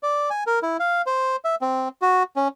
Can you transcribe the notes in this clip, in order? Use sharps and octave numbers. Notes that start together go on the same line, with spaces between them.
D5
G#5
A#4
E4
F5
C5
E5
C4
F#4
C#4